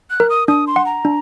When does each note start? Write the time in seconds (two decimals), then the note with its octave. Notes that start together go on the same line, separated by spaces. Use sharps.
0.10 F#6
0.20 A#4
0.30 D#6
0.48 D4 D#6
0.67 C6
0.76 F#5
0.86 A#5
1.05 D4